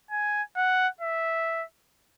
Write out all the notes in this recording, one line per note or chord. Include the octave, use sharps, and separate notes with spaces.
G#5
F#5
E5